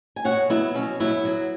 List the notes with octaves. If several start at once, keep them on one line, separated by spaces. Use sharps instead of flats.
G#5
B2 C#5 F#5
F#3 B3 E4
B2 C#4
F#3 B3 E4
F#3